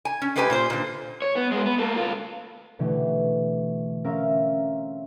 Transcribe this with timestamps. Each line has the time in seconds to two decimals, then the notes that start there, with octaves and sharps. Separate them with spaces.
0.05 G#5
0.22 C#4
0.36 G#3 A3 G4 B4 F5 G#5
0.50 A#2 F4 C5
0.70 A#2 D3
1.22 C#5
1.35 B3
1.51 G#3 B3
1.65 B3
1.78 A3 A#3
1.96 D2 F4
2.79 B2 D3 E3 A3 G4
4.04 C4 C#4 A#4 E5 F5